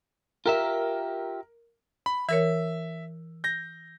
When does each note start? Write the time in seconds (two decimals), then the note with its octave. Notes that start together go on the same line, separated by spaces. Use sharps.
0.46 F4 G4 A#4 E5
2.06 B5
2.29 E3 A#4 C#5 E5
3.44 G6 A#6